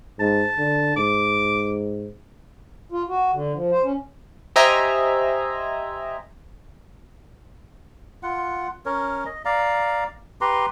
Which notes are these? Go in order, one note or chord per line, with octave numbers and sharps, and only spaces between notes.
G#2 A5
D3
G#2 D6
F4
F#4
D3
F3
C5
C#4
G4 C5 D#5 E5 G#5 A#5
F4 F#5
C#4 A#4 C#5
D#5
D5 F5 A#5
G4 B4 A#5 C6